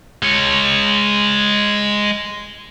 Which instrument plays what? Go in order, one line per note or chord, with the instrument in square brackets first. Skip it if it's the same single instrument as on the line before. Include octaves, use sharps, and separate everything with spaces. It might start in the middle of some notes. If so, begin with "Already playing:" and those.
[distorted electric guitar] G#3 C#5